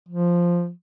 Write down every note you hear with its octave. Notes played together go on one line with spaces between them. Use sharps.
F3